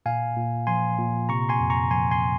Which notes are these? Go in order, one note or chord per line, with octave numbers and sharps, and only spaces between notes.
A#2 F5 G#5
A#2
F3 G#5 C6
A#2
C3 A#5 C#6
G#5 C6
F2
A#5 C#6
F3 G#5 C6
G#5 C6